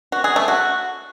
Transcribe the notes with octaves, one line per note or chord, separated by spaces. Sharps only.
F#4
G#4
A3
F#4